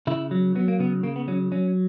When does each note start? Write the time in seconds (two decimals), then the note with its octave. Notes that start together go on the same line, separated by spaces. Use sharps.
0.07 C#3 E4
0.31 F#3
0.55 F#3 B3
0.68 A#3
0.79 C#3 B3
1.03 C#3 A#3
1.16 B3
1.28 F#3 C#4
1.52 F#3 C#4